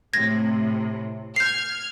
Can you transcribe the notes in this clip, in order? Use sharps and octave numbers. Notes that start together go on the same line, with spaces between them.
A2 C3 G#6 A#6
F6 G6 G#6 C7